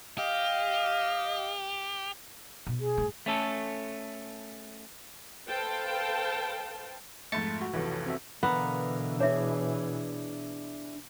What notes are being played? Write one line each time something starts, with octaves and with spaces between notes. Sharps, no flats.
G4 D#5 F5
B2
G#4
G2 A3
A3 C#4 A4
A4 B4 C5 F5 G5 A5
F2 G#2 A3 A6 C#7
F#4
F1 B1 E3
C4 F#4 E5
B2 D3 E3 B3 A#4 F5
D4 E4 G#4 C#5 E5